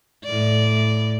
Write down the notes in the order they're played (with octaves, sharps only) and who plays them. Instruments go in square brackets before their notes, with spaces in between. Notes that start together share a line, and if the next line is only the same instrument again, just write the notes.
[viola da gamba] A2 D5